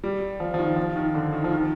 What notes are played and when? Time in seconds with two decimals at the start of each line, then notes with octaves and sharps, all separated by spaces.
0.04 G3
0.40 F3
0.54 F3
0.59 D#3
0.76 F3
0.96 D#3
1.14 D3
1.33 D#3
1.44 F3
1.51 D#3